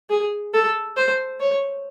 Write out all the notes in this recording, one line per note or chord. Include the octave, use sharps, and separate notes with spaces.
G#4
A4
C5
C#5